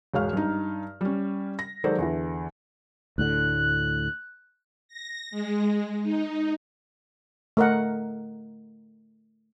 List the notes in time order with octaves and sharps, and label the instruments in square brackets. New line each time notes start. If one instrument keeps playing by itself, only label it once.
[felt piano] E1 G#2 C#5 F5 F6
G2 D#4
G3 C#4
A#6
D#3 F#3 G#3 A4 C5 D5
E2 D3 E3
[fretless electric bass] D2 A2 D3 [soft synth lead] F#6
[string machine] A#6
G#3
D#4
[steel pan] A3 A#4 D#5 F#5